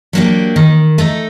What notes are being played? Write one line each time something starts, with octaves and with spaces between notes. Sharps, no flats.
F#3 A#3 D4 G4
D#3
A3 D#4 A4